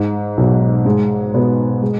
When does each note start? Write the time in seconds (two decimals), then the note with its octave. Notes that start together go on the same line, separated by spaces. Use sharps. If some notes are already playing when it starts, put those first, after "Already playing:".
Already playing: G#2
0.37 B1 B2
0.85 G#2 G#3
1.34 B2 B3
1.82 G#3